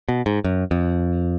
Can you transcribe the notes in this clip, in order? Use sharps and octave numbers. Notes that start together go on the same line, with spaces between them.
B2
G#2
F#2
F2